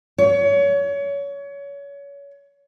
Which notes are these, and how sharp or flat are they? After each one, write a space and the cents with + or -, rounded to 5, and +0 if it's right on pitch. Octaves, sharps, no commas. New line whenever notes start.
C#5 +25